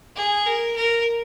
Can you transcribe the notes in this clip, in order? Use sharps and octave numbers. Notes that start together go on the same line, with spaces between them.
G#4
A#4
A#4